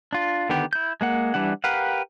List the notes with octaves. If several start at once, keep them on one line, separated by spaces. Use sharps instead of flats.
D4 F4
D3 D#3 B3 G4
E4 G6
G#3 A#3 F#5
E3 G3 D4 F#5
G4 A#4 B4 F5 F#5